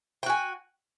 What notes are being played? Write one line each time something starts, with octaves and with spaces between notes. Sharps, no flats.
F#4 G5 G#5